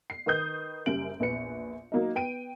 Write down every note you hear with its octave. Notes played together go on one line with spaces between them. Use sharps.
C7
D#3 B4 D#6 G6
F#1 F#2 G3 D7 F#7
A#1 E2 B4 C#7
F#3 A#3 D#4
B3 G5 D7 D#7